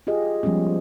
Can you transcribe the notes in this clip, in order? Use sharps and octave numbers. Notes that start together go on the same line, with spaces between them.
F4 G4 G#4 D#5
F3 G3 G#3 B3 C#4